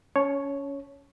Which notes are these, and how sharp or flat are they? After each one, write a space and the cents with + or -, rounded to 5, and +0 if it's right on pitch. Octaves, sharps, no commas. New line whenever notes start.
C#4 +20 C#5 +0 A5 -20